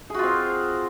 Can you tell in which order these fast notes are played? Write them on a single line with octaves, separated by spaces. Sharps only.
G#4 F#4 F4 C4